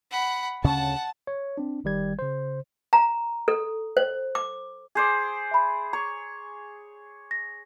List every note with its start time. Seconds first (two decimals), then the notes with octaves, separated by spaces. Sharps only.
0.11 F#5 B5
0.64 D2 C#3 C#4 F#5 A5
1.27 C#5
1.58 C4 D4
1.84 G1 D#3 G3 G#6
2.19 C#3 C5
2.93 A#5
3.48 A4
3.97 C5
4.35 D6
4.95 G#4 C5 D5
5.51 E5 B5
5.93 C#5 A#5
7.31 A#6